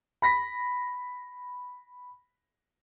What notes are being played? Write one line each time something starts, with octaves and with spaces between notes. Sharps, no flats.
B5 A#6 B6